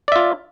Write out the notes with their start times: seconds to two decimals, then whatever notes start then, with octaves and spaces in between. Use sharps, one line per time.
0.08 D5
0.12 E5
0.16 F4